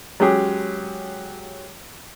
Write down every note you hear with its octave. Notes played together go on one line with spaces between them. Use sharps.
F#3 G#3 C#4 G4 G#4